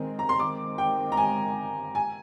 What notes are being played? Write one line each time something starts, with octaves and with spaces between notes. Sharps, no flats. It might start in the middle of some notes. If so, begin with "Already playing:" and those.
Already playing: D#3 G#3 C4
A#5
C6
D#3 G#3 C4 D6
G5
A#5
G#5
G#5